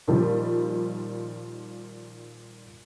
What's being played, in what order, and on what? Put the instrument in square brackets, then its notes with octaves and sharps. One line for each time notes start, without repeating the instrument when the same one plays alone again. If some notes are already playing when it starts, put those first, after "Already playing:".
[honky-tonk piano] A#2 D#3 F3 G3